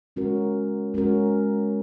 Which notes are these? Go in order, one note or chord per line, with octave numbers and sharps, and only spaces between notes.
G#3 C#4 F#4 A#4
G#3 C#4 F#4 A#4